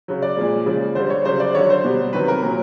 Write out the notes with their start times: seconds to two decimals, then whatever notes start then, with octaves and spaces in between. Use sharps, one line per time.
0.08 C#3 F#3
0.22 D5
0.37 A#2 F3 G#3
0.66 C#3 F3 G#3
0.95 D3 G3 C5
1.10 C#5
1.25 C#3 F#3 C5
1.40 D5
1.55 D3 F#3 C#5
1.70 C5
1.85 B2 G3
2.13 C3 D#3 F#3 B4
2.28 A#4
2.42 A#2 F#3